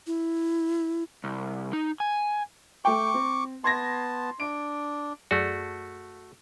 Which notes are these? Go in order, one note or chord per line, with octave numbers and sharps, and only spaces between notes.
E4
C2
D#4
G#5
A3 G5 C#6 D6
C4
B3 A5 C6 G#6 A#6
D4 D7
F#2 A3 F#4 G#4 D5